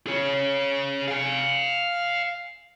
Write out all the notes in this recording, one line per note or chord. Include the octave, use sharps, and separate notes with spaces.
G#4 C#5
F5 G#5